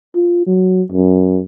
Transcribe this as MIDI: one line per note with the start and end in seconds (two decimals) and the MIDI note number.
0.15 0.42 65
0.46 0.82 54
0.92 1.41 42